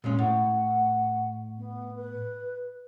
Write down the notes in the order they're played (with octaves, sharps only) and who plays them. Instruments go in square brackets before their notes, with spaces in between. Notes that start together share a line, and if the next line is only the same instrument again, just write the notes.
[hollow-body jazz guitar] A#2 G#3 C#4
[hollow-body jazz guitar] A2 [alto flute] F#5
[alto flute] B3
B4